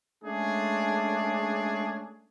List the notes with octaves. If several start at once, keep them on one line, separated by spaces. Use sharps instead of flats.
G#3 A3 C#4 D4 G#4